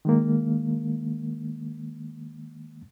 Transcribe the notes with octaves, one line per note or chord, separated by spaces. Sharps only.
D#3 G#3 A#3